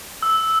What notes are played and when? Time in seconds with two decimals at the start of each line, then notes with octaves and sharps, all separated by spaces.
0.22 E6